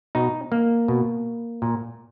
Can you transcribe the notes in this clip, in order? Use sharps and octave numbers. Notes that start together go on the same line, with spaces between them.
B2 D#4
A#3
B2
A#2